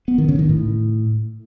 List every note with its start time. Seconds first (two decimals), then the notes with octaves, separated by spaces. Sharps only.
0.08 B3
0.18 D#3
0.29 C#3
0.39 D#3
0.49 A2